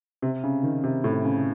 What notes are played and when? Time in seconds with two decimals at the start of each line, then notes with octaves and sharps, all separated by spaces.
0.22 C3
0.44 C#3
0.63 D#3
0.84 C3
1.04 A2
1.25 C#3